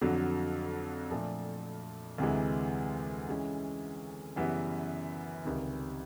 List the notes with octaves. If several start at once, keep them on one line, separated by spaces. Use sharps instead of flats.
F2 D3 F#3
A#2 F3 A3 D4
D2 C3 E3 G#3
C#3 E3 G#3 C#4
F#2 C#3 E3 G3 B3
C#2 C3 D#3 G3